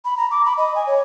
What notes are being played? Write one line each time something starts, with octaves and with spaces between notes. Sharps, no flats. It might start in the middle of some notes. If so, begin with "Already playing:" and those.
B5
A#5
D6
B5
D#5
G#5
C#5